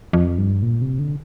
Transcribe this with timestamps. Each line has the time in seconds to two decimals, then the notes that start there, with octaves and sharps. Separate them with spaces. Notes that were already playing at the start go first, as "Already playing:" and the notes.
0.13 F2
0.38 G2
0.62 A#2
0.82 C3
0.99 D3